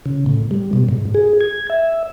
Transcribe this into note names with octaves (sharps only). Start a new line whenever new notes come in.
C#3
A2
G3
B2
G#2
G#4
G#6
E5